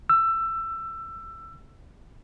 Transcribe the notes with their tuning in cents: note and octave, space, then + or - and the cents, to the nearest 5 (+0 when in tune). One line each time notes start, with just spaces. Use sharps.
E6 +20